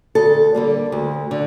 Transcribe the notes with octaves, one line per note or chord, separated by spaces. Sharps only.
D2 A4
D3 G3 A#3
D2
D3